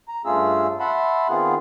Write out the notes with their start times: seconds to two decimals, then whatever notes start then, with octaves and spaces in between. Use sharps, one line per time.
0.08 A#5
0.25 G2 A3 C#4 F4 G#4 E6
0.80 E5 F#5 A5 B5 C6
1.29 D#3 B3 C4 F4 G#4